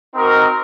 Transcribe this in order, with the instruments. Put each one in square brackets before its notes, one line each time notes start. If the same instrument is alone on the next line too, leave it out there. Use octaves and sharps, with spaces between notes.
[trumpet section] C4 D#4 F#4 A#4 D#5